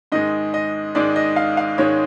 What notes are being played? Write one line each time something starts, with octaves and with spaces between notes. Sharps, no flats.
G#2 D#3 G#3 D#5
D#5
G#2 D#3 G#3 D5
D#5
F5
F5
G#2 D#3 G#3 C#5